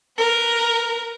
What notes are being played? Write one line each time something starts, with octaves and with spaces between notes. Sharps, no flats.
A#4 B4